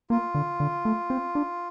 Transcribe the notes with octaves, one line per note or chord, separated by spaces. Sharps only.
A#3 F4
D3
D3
A3
C4
D4